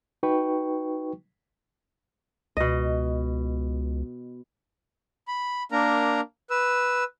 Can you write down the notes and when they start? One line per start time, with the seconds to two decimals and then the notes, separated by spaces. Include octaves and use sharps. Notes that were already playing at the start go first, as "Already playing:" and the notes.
0.23 D#4 F#4 B4 G5 C#6
2.57 C#2 B2 D#5
5.28 B5
5.72 A#3 D4 A#4 A#5
6.50 B4 E6